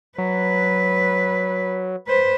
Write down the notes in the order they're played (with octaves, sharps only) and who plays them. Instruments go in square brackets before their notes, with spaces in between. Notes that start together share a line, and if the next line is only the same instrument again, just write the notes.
[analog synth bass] F#3 [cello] B4
[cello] B4 C5